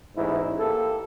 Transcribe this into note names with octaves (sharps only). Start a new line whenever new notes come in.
A1 E2 G#2 E4
A#3 G4 A4